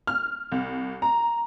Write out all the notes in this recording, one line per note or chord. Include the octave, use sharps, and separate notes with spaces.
F6
C2
A#5